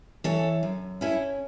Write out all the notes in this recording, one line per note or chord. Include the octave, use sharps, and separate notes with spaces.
E3 A4 C#5
F#2
C#4 E4 A4